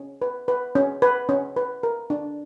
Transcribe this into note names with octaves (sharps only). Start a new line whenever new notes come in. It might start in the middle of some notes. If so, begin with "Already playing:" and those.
Already playing: C#4
B4
B4
C#4
B4
C#4
B4
A#4
D4